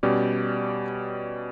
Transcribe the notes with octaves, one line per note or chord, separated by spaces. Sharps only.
B2 G3 C#4 G4 D5